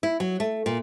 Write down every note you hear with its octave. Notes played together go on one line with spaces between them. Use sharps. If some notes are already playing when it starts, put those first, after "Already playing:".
E4
F#3
A3
A#2